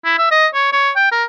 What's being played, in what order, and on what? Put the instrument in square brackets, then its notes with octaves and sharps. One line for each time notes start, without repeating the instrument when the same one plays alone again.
[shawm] E4
E5
D#5
C#5
C#5
G5
A#4